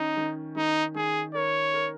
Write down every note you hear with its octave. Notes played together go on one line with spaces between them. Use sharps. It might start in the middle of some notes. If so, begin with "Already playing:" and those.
Already playing: D#3 C#4 D#4
D#3
D#3 D#4
D#3 G#4
A#4 C#5
A#4